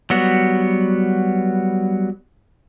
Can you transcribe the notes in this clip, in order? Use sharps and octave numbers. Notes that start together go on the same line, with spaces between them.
F#3 G3 B3 F#4